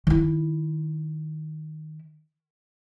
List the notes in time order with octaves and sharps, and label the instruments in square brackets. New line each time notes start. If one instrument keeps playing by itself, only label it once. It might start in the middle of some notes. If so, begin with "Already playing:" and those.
[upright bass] D#3 E4